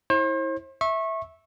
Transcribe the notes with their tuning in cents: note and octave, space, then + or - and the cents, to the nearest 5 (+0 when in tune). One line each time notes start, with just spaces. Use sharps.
E4 -25 C5 +40
E5 -10 C#6 -25